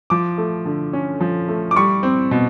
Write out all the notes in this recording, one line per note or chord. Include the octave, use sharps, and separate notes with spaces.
F3 D6
A3
D3
C#4
F3
A3
D6
G3 C#6
C4
B2